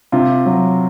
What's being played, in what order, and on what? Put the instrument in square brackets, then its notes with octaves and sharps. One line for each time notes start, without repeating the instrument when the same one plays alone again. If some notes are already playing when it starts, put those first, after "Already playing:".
[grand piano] C3 F4
F#3